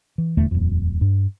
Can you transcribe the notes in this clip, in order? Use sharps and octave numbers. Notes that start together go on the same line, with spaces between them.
E3
D#1 E2 D3 A3
D#1 F2
G2